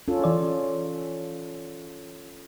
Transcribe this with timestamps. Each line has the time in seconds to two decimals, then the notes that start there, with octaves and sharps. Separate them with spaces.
0.08 C#4 F4 A4
0.24 E3 D5